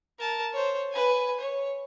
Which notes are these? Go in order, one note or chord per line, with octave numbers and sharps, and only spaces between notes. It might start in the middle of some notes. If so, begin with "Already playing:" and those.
A#4 A5
C5 C#5
B4 G#5
C#5